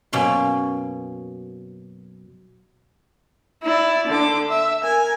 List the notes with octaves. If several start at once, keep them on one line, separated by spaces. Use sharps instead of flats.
F#2 B2 A#3 C#4 C6
E4 D5
D3 D6
E5
A#4 G#5